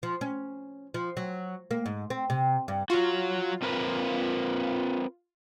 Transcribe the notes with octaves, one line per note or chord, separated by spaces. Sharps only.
F3
C#4
F3
F#3
A#3
G#2
C4
C3
G2
F#3 F4 F#4
C4 A#4 B4